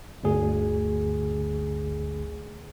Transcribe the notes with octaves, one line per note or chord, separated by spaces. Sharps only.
G1 D2 G#4